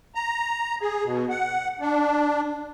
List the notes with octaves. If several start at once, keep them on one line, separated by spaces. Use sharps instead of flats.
A#5
G#4
B2
F#5
D4